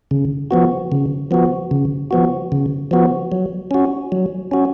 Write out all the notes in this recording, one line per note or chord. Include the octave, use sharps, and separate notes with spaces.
C#3
F3 B3 F#4
C#3
F3 B3 F#4
C#3
F3 B3 F#4
C#3
F3 B3 F#4
F#3
C#4 F#4
F#3
C#4 F#4